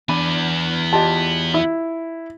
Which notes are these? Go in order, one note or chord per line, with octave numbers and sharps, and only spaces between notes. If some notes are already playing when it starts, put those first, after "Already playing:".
E2 B3 D4 G#5 B5
F4 G4 D#5 A5
E4